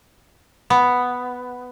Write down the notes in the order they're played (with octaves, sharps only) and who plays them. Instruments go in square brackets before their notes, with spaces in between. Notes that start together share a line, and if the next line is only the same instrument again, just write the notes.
[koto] B3